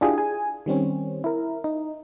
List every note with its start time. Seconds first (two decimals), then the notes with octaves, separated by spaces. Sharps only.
0.01 D4 E4 F4 G4 G#4
0.18 G#4 G#5
0.66 D#3 G3 C4 C#4
1.24 E4 A#4
1.64 D#4